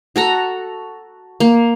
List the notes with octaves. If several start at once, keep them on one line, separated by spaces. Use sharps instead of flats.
F#4 A4 A#5
A#3